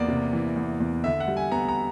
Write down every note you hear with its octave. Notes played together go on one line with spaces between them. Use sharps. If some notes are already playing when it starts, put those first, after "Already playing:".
Already playing: E2 A#3 D5
C3
E3
E2
E2
D3 E5
F#5
G3
G#5
B3 A#5
A#5